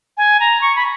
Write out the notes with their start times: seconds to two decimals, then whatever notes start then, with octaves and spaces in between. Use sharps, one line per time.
0.17 G#5
0.40 A#5
0.61 C#6
0.76 B5